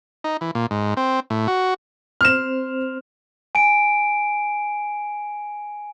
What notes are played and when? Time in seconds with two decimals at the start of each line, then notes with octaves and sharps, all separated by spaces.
0.24 D#4
0.41 E3
0.55 A#2
0.71 G#2
0.97 C4
1.30 A2
1.48 F#4
2.21 C4 C5 F6 E7
3.55 G#5 D7